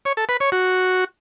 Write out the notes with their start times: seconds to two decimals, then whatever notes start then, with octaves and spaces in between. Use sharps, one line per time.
0.05 C#5
0.17 A4
0.29 B4
0.40 C#5
0.52 F#4